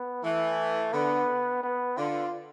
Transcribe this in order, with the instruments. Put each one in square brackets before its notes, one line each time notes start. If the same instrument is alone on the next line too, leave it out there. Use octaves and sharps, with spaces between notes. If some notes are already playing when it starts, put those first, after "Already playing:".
Already playing: [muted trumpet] B3
[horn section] E3 [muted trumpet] A3
[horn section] D3 [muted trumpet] B3
[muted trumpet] B3
[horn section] D3 [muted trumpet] F4